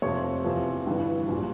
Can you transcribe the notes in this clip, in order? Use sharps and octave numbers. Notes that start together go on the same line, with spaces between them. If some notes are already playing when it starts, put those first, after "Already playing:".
F1 F2 C3 F3 C#5
E2 C3 F3
G1 G2 E3 G3
A#1 A#2 G3